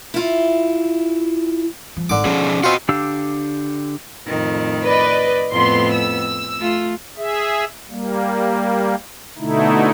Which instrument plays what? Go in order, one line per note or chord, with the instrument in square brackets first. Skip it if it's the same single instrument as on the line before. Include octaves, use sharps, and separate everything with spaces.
[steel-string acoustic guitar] E4 F4
[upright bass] F3
[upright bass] G#1 [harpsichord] D3 D6
[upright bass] B2 [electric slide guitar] F3 C#4 G#4
[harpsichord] C4 F4 [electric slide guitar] F#4 D#5
[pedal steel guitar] D3 D4 G4 F5 E6
[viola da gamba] F2 A2 D#3
[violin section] B4 D5 D#5
[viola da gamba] F2 A2 B3 [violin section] C6
[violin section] E6
[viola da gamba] A3 F4
[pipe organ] G#4 E5
G3 A#3
B2 D3 A3 D#4 E4